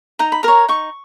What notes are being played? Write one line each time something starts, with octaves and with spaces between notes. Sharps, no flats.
D#4 A#5
B5
A#4 C#5 A#5
D#4 C#6